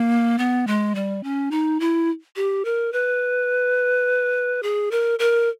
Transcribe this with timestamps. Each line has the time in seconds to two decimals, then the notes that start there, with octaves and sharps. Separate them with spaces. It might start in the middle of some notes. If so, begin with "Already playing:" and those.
Already playing: A#3
0.38 B3
0.67 G#3
0.95 G3
1.24 C#4
1.51 D#4
1.80 E4
2.36 G4
2.65 A#4
2.93 B4
4.63 G#4
4.91 A#4
5.19 A#4